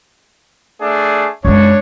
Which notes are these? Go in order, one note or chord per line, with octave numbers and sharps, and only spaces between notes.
A3 D4 G#4
F#2 G#3 D4 C#5